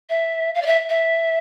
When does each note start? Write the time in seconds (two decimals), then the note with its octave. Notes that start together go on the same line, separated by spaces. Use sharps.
0.09 E5
0.54 F5
0.62 D5
0.66 E5
0.89 E5